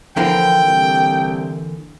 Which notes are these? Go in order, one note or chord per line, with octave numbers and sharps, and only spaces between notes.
D3 E3 F3 A#3 G5
C2